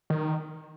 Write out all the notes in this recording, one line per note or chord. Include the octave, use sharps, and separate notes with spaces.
D#3